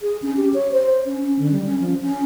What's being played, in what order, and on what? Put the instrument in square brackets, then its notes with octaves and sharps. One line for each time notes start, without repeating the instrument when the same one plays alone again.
[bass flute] G#4
C#4
G4
C#5
C5
C#4
C#4
D3
G3
C#4
F3
C#4